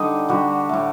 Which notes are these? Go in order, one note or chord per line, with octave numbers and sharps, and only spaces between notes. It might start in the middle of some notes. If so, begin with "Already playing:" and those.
Already playing: D3 G3 D#4 A4
D3 G3 F#4
A2 A3